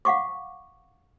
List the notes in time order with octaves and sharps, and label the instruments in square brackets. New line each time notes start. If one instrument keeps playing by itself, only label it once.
[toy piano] F5 F#5 C#6 D6